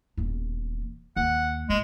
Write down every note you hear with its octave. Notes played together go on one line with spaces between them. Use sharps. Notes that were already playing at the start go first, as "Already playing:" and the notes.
D#1 E2
D#2 F#5
A1 G#3